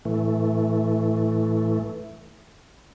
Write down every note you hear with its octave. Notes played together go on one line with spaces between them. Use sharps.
A2 E3 A3